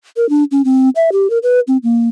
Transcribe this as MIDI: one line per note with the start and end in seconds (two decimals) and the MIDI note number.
0.16 0.28 70
0.29 0.44 62
0.51 0.61 61
0.65 0.89 60
0.96 1.10 76
1.12 1.30 67
1.30 1.38 70
1.43 1.60 71
1.67 1.77 60
1.83 2.08 58